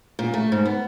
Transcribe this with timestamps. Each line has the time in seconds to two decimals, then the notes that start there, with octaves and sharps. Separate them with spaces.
0.19 A#2
0.34 A3
0.52 G#2
0.66 B3